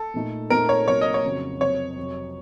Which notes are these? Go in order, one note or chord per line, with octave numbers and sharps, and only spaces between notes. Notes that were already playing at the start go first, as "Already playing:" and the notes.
Already playing: A4
A#2 A3 D#4
A#2 A3 C4 D#4 A#4
C#5
C3 F#3 A#3 D#4 C#5
D#5
C#5
F2 C#3 F#3
F2 C3 F#3 C4 C#5
F2 C3 F#3